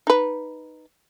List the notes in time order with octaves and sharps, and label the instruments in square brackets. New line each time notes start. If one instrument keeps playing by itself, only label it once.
[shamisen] D#4 B4